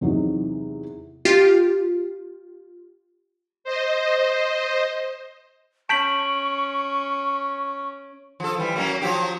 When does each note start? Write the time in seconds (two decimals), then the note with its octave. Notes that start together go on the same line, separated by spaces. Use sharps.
0.01 E2 C3 E3 F#3 D#4
1.25 F4 G4
3.64 C5 D#5
5.89 C#4 A5 C#6 G6 B6 D7 F#7
8.40 F3 A4
8.58 E3 G3
8.76 F#3 A#3 C#4
9.02 F3 F#3 G4